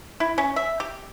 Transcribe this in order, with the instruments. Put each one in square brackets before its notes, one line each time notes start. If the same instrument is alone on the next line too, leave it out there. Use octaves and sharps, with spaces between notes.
[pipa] E4
C#4
E5
G4